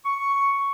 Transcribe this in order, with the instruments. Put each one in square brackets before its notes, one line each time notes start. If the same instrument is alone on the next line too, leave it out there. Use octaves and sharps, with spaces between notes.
[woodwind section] C#6